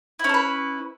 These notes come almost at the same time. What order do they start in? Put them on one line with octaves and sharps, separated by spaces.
E4 C#4 A4 B4